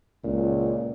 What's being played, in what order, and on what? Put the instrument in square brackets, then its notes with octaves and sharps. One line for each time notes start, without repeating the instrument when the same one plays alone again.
[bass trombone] C#2 [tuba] A#2